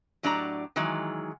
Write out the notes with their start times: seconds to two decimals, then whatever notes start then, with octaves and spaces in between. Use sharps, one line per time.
0.23 A2 F#3 D4 G4 D5 A#5
0.76 D#3 E3 F#3 G#3